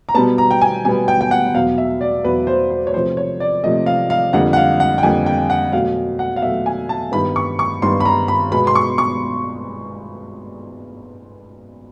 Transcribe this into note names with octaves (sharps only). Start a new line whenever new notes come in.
A#5
B2 G3 B3 A5
A#5
G5
G#5
B2 G3 B3 G#5
G5
G5
F#5
E2 B2 F#3 F5
E5
D5
E2 B2 F#3 B4
C5
C5
C#5
C3 F3 A3 C5
C#5
D5
C3 F3 A3 D#5
F5
F5
F2 D3 G3 A#3 F#5
F#5
F5
F#5
G5
F2 D3 G3 A#3 G#5
G5
F#5
B2 F#3 A3 F5
F#5
F5
B2 F#3 A3 E5
G#5
A5
G2 D#3 G3 B3 B5
C#6
C#6
G2 D#3 G3 B3 C6
B5
A#5
B5
B2 G#3 B3 B5
C6
C#6
C#6